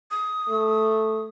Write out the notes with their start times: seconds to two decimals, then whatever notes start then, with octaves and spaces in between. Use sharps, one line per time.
0.11 D#6
0.49 A3